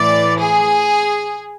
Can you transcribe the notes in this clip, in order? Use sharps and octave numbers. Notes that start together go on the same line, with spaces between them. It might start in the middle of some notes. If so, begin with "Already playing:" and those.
Already playing: A2 E3 D5
G#4